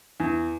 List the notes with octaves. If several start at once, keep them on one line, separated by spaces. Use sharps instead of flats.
E2